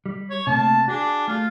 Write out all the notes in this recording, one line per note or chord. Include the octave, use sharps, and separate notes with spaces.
G3
C#5
C3 A3 A#3 A5
D4 F#4 G#4
A3 F4